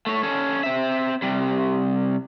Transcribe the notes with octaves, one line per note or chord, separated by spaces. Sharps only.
A3 C#5
C#4 A4
C4 E5
C3 G3